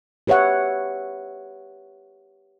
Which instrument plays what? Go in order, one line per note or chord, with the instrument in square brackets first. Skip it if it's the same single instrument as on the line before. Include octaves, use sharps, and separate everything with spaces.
[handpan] G4 B4 C#5 E5 F#5